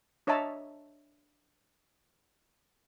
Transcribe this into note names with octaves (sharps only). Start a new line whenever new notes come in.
D4 C#5 D#5 E5 A5 A#5